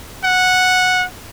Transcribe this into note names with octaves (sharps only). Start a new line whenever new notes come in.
F#5